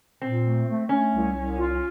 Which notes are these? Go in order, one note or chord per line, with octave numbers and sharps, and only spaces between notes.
A#2 C4
A3
A3
A3 C#4
C2
C2
F4